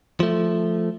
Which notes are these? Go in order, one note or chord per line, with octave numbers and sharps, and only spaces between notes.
F3 A3